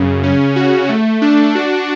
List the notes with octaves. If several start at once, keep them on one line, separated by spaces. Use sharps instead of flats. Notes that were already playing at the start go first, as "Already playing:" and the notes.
Already playing: F#2 C#3
C#4
F#4
A3
D4
F#4